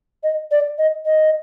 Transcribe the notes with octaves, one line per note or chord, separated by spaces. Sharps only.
D#5
D5
D#5
D#5